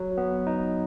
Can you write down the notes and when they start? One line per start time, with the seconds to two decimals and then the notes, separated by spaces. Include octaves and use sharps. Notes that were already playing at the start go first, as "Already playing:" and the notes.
Already playing: F#3
0.17 B3
0.47 D#4